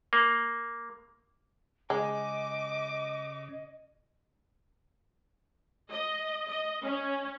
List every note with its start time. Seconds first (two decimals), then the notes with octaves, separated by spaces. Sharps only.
0.13 A#3
1.90 C#3 G#3 D#5 D6
5.91 D#5
6.49 D#5
6.83 C#4